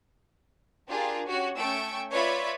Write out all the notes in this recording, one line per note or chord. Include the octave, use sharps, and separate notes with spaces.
D4 F4 G4 G#4 A#4
C#4 F#4 G4 C#5
A3 C#4 G5 C#6 E6 D7
F4 B4 C#5 D5 E5 B5